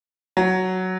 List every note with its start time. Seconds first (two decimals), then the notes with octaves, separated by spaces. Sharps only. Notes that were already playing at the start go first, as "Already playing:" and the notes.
0.37 F#3